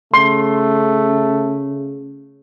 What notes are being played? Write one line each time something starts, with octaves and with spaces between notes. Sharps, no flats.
C#3 A3 C6